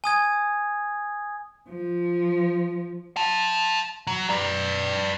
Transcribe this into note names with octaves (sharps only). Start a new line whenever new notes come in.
G#5 D#6 G#6
F3
F5 A5
F#3
B4 D5